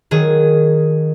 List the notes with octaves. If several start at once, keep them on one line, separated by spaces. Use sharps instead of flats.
D#3 F#3 G#4